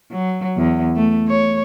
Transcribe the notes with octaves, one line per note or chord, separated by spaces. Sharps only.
F#3
E2
A3
C#5